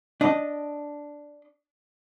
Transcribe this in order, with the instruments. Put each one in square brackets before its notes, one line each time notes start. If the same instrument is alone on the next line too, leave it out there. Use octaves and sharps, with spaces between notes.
[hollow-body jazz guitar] D4 D#5